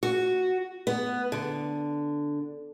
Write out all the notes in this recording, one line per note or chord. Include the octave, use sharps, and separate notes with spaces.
F#4
B3
D3